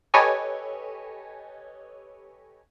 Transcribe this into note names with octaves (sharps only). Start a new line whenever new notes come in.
G4 A4 B4 C#5 D#5 G#5